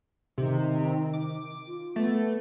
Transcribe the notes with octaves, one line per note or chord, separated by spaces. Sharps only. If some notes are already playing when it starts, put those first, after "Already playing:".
C3 D#3
D6
F4
A3 B3